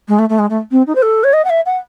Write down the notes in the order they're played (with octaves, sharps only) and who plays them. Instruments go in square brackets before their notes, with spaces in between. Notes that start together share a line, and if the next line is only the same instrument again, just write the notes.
[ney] G#3
A3
A3
G#3
A3
C4
D#4
C5
A4
C#5
D#5
F#5
E5
F#5